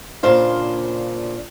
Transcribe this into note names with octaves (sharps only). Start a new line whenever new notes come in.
A#2 C#3 D4 C5 F5